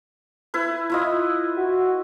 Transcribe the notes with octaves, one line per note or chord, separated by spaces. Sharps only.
E4 B4
E4 F4 D#5
F#4